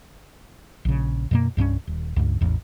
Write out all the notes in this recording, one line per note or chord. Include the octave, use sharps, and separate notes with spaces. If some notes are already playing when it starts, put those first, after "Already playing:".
A#1 C#3
F#2 B2 A#3
C2 G2 G#3 C#4
D#1
C#2 G2
A1 E2